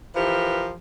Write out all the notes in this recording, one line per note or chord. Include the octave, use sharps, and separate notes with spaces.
E3 F3 G4 A#4 B4